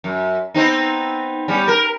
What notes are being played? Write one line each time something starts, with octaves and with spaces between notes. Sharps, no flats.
F#2
B3 C4 D#4
G3 B3 C#4
A#4